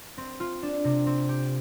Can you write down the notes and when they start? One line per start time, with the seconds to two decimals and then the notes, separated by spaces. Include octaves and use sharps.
0.18 C4
0.40 F4
0.63 D4
0.84 C3
1.06 C4
1.29 G4